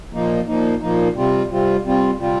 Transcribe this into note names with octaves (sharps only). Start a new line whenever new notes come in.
A#2 F3 A#3 D#4
A#2 F3 A#3 D#4
A#2 F3 A#3 D#4
C3 G3 C4 F4
C3 G3 C4 F4
C3 G3 C4 F4
C3 G3 C4 F4